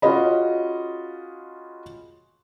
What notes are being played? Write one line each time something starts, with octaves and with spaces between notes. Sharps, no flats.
C#4 F4 F#4 G#4 D#5 B5